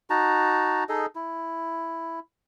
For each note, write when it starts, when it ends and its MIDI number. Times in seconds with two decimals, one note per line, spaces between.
0.10 0.84 63
0.10 0.84 66
0.10 0.84 81
0.10 0.84 82
0.89 1.06 63
0.89 1.06 68
0.89 1.06 69
0.89 1.06 75
1.15 2.19 64